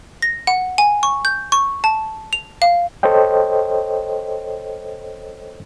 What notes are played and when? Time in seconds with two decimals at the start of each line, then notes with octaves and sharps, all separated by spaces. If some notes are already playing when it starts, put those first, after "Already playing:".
0.22 A#6
0.47 F#5
0.78 G#5
1.03 C#6
1.25 G6
1.52 C#6
1.84 A5
2.33 F7
2.62 F5
3.03 A4 C5 C#5 D#5 G5